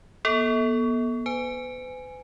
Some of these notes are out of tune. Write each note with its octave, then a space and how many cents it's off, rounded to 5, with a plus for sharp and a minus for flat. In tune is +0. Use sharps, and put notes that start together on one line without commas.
B3 -35 A4 +0
B4 +45 G#5 +0